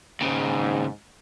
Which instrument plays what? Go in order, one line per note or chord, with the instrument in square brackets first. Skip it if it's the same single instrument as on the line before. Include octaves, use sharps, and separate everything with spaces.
[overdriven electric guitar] D#2 C#3 [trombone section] G#2